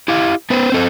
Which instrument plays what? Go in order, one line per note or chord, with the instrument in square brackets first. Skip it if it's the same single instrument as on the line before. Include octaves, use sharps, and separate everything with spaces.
[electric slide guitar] E4 G4 F5
B3 B4 C5
C4 A4 C5